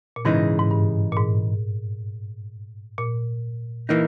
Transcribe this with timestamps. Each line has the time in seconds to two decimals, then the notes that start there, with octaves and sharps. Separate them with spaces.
0.16 A#2
0.25 G#2 C#3 E3 G#3 D#4
0.59 G#2
0.71 G2
1.12 A#2
1.17 G#2
2.98 A#2
3.89 E3 A#3 D#4